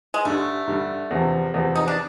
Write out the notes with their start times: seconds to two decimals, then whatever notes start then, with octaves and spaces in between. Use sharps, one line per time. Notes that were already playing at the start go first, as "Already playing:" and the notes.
0.14 G#3
0.25 G2 D3 G3 A3
0.67 G2 D3 G3
1.11 E2 C3 F3
1.54 E2 C3 F3
1.75 D#4
1.88 D4